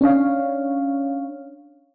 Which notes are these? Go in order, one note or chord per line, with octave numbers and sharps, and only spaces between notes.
C#4 D4 C#5 F5